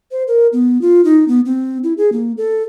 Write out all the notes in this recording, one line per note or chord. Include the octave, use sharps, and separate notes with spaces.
C5
A#4
B3
F4
D#4
B3
C4
E4
G#4
A#3
A4